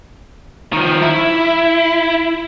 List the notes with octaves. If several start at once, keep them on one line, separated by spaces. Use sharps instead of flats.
D#3 F3
E4